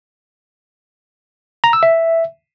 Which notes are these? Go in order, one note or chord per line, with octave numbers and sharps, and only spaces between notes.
A#5
E6
E5